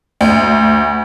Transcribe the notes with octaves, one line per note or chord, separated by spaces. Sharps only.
D2